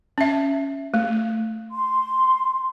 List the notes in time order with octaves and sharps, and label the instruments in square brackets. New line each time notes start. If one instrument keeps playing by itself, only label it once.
[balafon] C#4 E5
A3
[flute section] C6